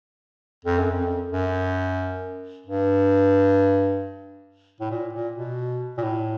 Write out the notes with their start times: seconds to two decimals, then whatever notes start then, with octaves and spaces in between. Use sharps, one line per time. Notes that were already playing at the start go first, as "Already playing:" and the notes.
0.65 F2
0.78 F#2
0.92 F2
1.32 F#2
2.66 G2
4.80 A2
4.91 A#2
5.13 A#2
5.36 B2
5.98 A#2
6.03 A2